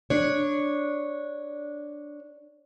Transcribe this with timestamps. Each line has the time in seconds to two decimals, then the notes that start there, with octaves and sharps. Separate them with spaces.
0.10 D4 C#5